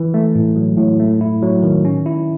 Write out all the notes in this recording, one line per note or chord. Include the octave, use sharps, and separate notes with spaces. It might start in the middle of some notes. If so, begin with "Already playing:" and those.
Already playing: E3
A3
A2
F#3
A2
A3
E4
F#3
D#3
C#4
E4